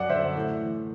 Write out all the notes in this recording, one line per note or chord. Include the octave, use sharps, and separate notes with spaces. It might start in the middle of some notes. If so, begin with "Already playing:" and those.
Already playing: F#2 D5 F#5
D3 C5 E5
A2 A4
E3